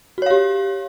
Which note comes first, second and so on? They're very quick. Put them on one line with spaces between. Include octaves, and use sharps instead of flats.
F#4 C#5 F5 G4